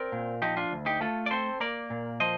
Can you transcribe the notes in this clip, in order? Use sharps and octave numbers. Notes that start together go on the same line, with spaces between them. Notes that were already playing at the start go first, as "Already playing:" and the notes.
Already playing: C4 A#4 D5
A#2
F3 D#4 G4
D4 F4
D2
D#4 G4
A3 F4 A4
D5
C4 A4 C5
A#3 A#4 D5
A#2
F3 C5 D#5